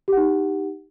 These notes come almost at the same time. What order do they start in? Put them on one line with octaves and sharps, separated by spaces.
G4 F#5 D#4